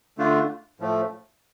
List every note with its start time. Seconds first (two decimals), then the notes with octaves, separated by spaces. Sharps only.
0.18 D3 A3 D4 F4
0.80 A2 F3 A3